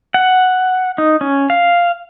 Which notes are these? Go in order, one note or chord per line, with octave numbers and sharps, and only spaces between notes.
F#5
D#4
C#4
F5